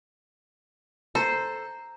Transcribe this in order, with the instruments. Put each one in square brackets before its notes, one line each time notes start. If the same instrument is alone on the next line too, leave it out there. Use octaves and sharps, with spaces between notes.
[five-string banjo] A4 [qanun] C5 [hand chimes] A#5